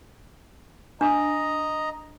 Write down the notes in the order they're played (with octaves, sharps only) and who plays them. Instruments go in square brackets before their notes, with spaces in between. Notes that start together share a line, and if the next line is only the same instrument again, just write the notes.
[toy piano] D4 [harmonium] D#5 A#5